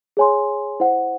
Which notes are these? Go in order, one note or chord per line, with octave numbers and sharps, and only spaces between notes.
G#4 C#5 G#5 C6
E4 C5 F#5